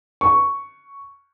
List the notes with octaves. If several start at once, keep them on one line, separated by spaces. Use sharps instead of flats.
C#6